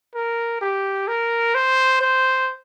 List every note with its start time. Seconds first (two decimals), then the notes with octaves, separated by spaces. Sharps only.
0.15 A#4
0.61 G4
1.08 A#4
1.55 C5
2.01 C5